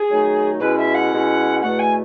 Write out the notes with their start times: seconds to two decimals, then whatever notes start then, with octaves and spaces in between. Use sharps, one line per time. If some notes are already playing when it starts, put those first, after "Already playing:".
Already playing: G#4
0.10 D#3 F#3 A3 D#4
0.60 B2 G#3 C#4 E4 B4
0.78 E5
0.95 F#5
1.12 B2 G#3 C#4 E4
1.62 E2 B2 A3 F#5
1.79 G#5